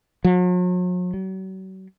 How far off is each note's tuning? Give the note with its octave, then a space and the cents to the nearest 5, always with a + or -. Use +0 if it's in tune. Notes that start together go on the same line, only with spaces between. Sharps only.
F#3 -45
F#3 +40